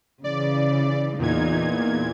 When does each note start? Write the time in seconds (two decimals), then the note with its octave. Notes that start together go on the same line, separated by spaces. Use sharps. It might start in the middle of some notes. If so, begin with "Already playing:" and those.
0.24 C#3 E3 D5
1.19 E2 A#2 D#4 G#6